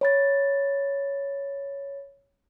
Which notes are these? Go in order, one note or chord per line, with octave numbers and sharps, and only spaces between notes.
C#5 B5 A6